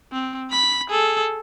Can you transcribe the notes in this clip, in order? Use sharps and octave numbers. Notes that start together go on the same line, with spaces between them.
C4
B5 B6
G#4 A4